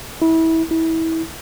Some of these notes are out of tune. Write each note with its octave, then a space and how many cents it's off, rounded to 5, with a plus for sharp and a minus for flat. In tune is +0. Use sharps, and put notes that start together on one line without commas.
E4 -25
E4 -25